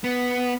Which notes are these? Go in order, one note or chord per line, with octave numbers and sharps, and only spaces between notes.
B3